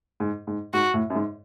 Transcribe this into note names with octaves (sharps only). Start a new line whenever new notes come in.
G#2
G#2
G#2 F#4
A2
F#2
G#2